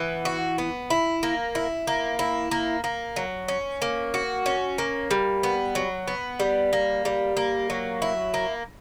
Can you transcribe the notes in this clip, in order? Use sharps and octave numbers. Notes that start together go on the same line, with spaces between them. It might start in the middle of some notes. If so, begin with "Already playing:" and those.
Already playing: E3 B3
F#4
B3
E4
A#3
E4
A#3
E4
A#3
A#3
F#3
C#4
A#3
F#4
C#4
A#3
G3
B3
F#3
B3
G3
A#3
G3
A#3
F#3
E4
A#3